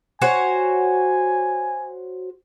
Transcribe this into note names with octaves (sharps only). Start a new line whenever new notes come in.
F#4 C5 C#5 G#5